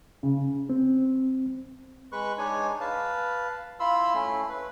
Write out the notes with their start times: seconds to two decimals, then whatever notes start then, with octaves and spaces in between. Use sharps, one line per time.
0.23 C#3
0.70 C4
2.12 G#3 B4 C#6 F#6
2.38 G#3 D4 D#4 C#5 G#5
2.81 B4 F5 A5
3.80 E4 F4 B5 C6 E6
4.14 A3 C#4 E4
4.49 B4